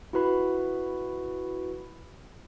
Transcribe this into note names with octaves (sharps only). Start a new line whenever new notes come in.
E4 F#4 B4 B5